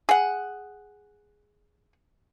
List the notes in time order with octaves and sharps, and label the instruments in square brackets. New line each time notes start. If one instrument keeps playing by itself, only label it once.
[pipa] G#4 F#5